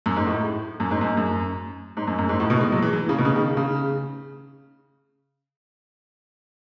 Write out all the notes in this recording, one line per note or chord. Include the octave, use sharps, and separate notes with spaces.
F#2
G#2
A2
F#2
G#2
F#2
F#2
G#2
F#2
F#2
G#2
A2
B2
G#3
F#3
E3
E3
C#3
B2
C#3
D#3
C#3